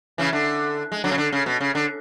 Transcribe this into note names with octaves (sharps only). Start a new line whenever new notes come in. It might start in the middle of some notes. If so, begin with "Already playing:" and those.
C#3 E3
D3
G#3
D3 F#3
C#3
D3
C#3
B2
C#3
D3